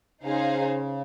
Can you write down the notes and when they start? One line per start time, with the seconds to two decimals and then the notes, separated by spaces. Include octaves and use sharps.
0.23 C#3 D#4 G#4 C5 F5